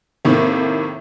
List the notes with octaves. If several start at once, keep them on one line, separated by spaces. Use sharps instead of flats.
A2 C3 D#3 A#3